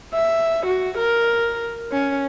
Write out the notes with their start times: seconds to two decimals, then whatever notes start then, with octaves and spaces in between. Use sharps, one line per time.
0.14 E5
0.66 F#4
0.98 A#4
1.92 C#4